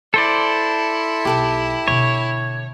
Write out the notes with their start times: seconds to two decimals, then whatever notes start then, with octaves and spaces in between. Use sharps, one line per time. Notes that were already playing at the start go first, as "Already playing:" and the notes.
0.14 E4 A4 C5 D5
1.25 B1 G4 A4 G5
1.88 B2 D3 C#5